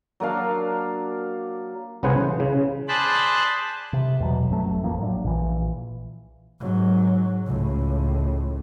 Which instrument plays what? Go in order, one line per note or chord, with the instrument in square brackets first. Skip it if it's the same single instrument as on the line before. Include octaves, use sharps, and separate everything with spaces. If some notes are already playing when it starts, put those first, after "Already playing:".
[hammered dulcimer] F#3 A#3 D4 F5
[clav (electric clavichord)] C2 C#3 B3 C5 F#5 G#5
E3
C#3
[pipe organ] G#4 C5 D5 A5 B5 F#6
[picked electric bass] C3
E2 B2 F3 F#3
G1 F#2 F#3 A3
A1 F2 F3 A#3
A2 F#3 D4
A#1 A#2 E3
[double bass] G#2 F#3
C#2 A2